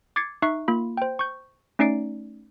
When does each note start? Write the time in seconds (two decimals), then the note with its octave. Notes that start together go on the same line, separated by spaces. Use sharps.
0.16 D6 G#6 A6 C7 C#7
0.42 D#4 E5 C#6 F#6 C7
0.68 A#3 F4 B5
0.97 C5 G5
1.19 C#6 G6
1.79 A3 C#4 D#4 D5 C7 D7